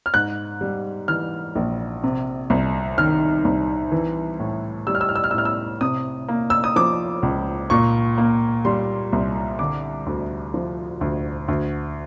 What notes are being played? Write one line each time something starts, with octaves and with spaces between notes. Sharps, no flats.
F6
G#2 F#6
G3
E3 F6
A#1
C3
C2
D#3 F6
C2
E3
A2
G3 E6
F6
E6
F6
E6
F6
E6
A2 F6
E6
C3 D#6
A#3
E6
D#6
F3 D6
C#2
A#2 C#6
A#3
G3 C6
C2
D3 D6
D2
F3
D2
D2